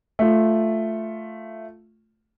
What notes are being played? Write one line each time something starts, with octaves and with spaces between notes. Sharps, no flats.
A3 F4